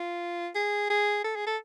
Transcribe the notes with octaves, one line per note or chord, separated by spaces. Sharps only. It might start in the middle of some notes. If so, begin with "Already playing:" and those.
Already playing: F4
G#4
G#4
A4
G#4
A4